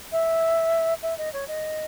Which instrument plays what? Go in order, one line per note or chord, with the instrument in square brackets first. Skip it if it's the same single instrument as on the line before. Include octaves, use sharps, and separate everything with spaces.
[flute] E5
E5
D#5
C#5
D#5